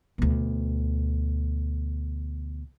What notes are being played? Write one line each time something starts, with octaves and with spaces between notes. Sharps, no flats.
D2 B2